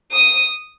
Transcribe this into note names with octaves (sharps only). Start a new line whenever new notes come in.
D#6